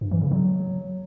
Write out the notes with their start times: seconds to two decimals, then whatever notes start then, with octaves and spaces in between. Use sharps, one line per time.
0.01 G2
0.11 E3
0.21 C#3
0.31 F#3